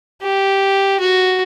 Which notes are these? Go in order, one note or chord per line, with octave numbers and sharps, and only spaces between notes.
G4
F#4